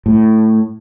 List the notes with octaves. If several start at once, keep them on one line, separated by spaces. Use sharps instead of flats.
A2